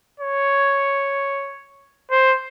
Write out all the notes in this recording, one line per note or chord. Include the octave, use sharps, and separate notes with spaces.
C#5
C5